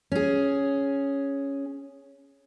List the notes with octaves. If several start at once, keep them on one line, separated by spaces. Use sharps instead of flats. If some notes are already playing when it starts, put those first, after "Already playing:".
C#4 G#4